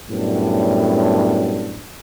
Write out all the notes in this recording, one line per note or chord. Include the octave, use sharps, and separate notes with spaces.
F#2 A2 G3 B3 D4